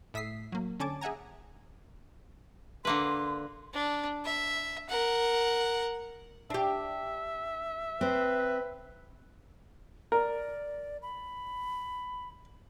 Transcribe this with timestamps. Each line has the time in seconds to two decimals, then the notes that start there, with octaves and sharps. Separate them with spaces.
0.14 A2 E5 D#6 B6 C7
0.52 F#3 A#3
0.80 D3 C#4 G#5 A5 D6
1.01 G#4 E5 F#5 G#5 A#5
2.85 D3 A#3 B4 C6
3.74 D4
4.25 E5
4.89 A#4 F#5
6.50 D4 G4 E5
8.01 C4 B4
10.12 A#4 D5
11.02 B5